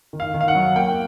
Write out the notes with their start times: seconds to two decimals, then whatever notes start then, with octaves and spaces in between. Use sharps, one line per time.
0.13 D#3
0.20 F5
0.34 D#3
0.41 F5
0.48 F#5
0.55 F#3
0.76 A#3 G5